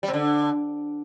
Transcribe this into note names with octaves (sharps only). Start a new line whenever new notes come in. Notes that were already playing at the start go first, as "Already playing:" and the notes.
G3
C3
D3